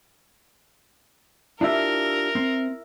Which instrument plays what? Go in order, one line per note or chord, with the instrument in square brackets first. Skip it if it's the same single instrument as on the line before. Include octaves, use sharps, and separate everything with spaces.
[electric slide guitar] D4 F4 G4 [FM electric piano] E4 E5 [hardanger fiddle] A#4
[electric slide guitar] C4